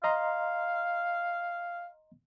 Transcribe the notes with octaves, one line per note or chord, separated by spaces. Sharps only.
D#5 F5 A#5 C6